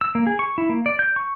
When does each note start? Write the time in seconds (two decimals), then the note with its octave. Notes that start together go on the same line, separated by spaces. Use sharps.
0.01 E6
0.15 A#3
0.27 G#4
0.39 C#6
0.58 E4
0.69 A#3
0.86 D5
0.99 G6
1.16 C#6